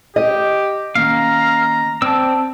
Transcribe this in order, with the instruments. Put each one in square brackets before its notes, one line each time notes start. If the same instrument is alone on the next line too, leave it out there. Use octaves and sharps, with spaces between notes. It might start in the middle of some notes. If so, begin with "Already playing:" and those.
[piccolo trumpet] G4 [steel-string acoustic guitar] D#5
[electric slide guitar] D#3 A#3 C#4 [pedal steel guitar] F5 [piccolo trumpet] A#5
[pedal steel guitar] C4 E6 [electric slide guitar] D5 A5